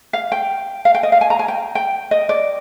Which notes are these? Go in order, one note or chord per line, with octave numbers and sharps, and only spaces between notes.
F5
G5
F5
G5
D#5
F5
G#5
A#5
G#5
G5
G5
D#5
D5